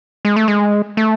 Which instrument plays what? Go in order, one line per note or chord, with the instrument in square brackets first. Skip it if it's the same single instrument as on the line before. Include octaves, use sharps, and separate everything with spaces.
[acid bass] G#3
A3
G#3
A3